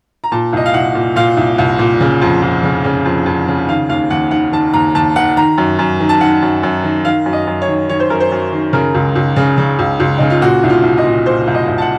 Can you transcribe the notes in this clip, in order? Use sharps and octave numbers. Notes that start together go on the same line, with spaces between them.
A#5
A#2 A5
C2 D#5
F5
C2 F#5
A#2
A#2 F5
C2
C2
A#2
C#3
F2
F2
C#3
C#3
F2
F2
C#3
D#3 F5
D#2 F5
D#2 F#5
D#3 F#5
D#3 A5
D#2 A#5
D#2 A5
D#3 F#5
D#3 A#5
F#2
F#2
D#3
A5
D#3 F#5
F#2
F#2
D#3
D#3 F5
F#2
D#5
F#2
C#5
D#3
D#3 C#5
C5
F#2 A#4
C5
F#2
D#3
C#3 A#4
C#2
C#2
C#3
C#3
C#2
C#2
C#3 D#4
F4
A#2 F#4
C2
F4
C2
D#5
A#2
A#2 C5
C2
D#5
C2
A5
F#5